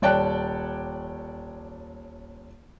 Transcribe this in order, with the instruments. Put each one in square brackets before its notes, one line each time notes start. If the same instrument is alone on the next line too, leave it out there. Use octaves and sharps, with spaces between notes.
[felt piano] D#1 C#5 D5 G5 A5 F#6